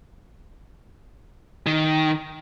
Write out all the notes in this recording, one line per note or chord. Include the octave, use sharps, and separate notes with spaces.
D#3